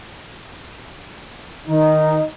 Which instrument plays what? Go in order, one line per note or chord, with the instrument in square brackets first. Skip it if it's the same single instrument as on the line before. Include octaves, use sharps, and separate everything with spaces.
[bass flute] D#3 [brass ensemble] D#4